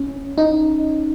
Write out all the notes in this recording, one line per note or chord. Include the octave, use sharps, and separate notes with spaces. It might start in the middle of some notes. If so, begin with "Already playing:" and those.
Already playing: C#4
D#4